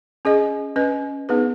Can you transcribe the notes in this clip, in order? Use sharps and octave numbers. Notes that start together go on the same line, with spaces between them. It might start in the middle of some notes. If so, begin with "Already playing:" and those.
C#4 G#4 D#5
C#4 B4 D#5
B3 D#4 G#4 B4